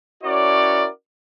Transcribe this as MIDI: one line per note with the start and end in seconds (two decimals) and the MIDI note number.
0.23 0.88 61
0.23 0.88 64
0.23 0.88 66
0.23 0.88 70
0.23 0.88 73
0.23 0.88 74